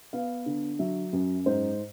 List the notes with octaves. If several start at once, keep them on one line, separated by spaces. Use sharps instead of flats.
B3 F5
D3
F#3 E5
F#2
G#2 C5